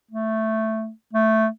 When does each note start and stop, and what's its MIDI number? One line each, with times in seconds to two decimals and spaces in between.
0.11 0.90 57
1.13 1.47 57